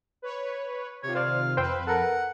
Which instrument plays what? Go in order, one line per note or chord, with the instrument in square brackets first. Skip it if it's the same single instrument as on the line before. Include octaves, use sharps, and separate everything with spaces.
[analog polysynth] B4 C#5
[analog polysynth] C3 D#3 F4 [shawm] C#5
[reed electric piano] C5 D5 [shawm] F5
[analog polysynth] F2 B4 [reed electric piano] C5 G5 E6
[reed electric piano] A4 A#4 [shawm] F#5